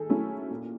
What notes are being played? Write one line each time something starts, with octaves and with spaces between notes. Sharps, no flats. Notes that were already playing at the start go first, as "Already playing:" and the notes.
Already playing: D#3 G#4 A4
F#3 A3 C#4 E4
A#2